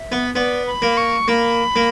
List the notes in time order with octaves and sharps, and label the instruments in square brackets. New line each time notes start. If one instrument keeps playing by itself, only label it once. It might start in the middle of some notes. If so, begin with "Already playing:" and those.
Already playing: [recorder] E5
[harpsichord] B3
[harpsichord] B3 [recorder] D5
[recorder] B5
[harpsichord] A#3
[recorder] C#6
[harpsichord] A#3 [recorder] B5
[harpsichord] A#3